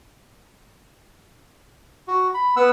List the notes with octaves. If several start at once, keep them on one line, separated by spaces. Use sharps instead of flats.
F#4
B5
B3 F#5 E6